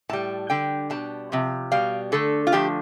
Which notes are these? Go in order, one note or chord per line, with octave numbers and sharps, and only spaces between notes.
A2 G3 A5
D3 G3 G5
B2 G3 A5
C3 F3
B2 G3 F5
D3 A3 A4
F4
D3 F3 A3 G4